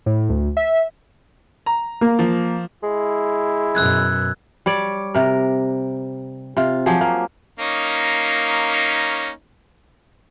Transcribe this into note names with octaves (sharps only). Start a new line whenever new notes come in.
A2
D2
E5
A#5
A#3
F3
G#3 E4
F#2 B2 E6 F#6 G#6
G3 C#5 D5
C3 A#4
C3 F4
F3 F#3 G4 G#4
A#3
A#3 C#4 D#4